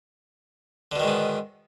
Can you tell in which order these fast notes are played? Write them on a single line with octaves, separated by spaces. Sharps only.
D3 B2 D#3 G#2 B3